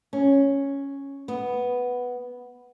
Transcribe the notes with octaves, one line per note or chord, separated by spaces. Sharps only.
C#4
B3